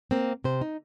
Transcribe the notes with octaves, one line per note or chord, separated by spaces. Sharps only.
A#3 C4
C3 C5
D#4